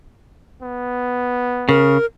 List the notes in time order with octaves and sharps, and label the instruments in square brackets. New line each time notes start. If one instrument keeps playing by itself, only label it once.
[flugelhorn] B3
[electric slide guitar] C#3 [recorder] A#4